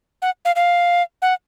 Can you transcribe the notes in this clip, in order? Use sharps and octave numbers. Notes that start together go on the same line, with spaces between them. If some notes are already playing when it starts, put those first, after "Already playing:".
F#5
F5
F5
F#5